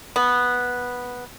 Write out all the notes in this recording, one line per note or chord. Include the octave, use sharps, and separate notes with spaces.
B3